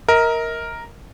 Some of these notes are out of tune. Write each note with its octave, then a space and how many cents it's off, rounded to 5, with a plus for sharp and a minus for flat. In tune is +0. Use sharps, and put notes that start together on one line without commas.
A#4 +0 D#5 +40